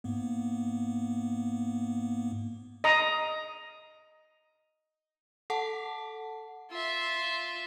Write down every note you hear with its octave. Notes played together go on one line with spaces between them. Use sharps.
G#2 A#3 B3
D#5 A#5
A4 F#5 A5
F4 E5